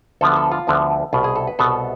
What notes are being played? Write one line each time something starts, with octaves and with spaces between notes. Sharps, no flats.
D2 D3 F3 B3 A4
A4
F4
D2 D3 F3 B3
C2 B2 B3 F4
G#4
A4
B4
C2 B2 B3 A4